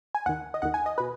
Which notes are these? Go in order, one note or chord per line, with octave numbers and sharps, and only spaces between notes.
G#5
D#2 D#3 F#5
D#5
D#2 D#3 F#5
G#5
D#5
B2 B4